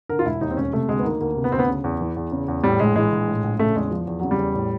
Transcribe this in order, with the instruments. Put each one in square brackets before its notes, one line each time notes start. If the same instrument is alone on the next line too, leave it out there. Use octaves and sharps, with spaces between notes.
[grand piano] D3 A#4
F4
E1 E4
D#2 D#4
C4
E1 C#4
C3 A3
D2 G#3
B3
D#3 A#3
D2 A#3
C3
B3
D2 C4
B3
C#3
E2
E3
E2
C#3
E2
A2 G3
A#1 G#3
E3 G#3
A#1
A2
A#1
C#3 A3
E2 G#3
F3
E2
C#3 F#3
G3
E2
A2